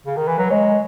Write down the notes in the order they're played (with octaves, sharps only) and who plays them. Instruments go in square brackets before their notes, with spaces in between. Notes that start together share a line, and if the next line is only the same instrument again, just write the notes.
[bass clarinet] C#3
D#3
E3
[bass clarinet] F#3 [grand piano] B4
[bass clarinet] G#3 [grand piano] C#5